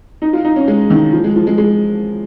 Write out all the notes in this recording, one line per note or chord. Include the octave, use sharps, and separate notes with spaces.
D#4
F4
D#4
C#4
G#3
D#3
F3
G#3
F3
G#3
G#3